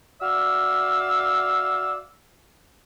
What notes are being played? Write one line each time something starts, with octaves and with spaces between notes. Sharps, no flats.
F#4 D5 E5 F5 E6